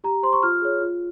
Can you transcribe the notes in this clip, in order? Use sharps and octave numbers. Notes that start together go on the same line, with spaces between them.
G4 A#5
C5 C6
C#6
F4 F6
G#4 C#5
F4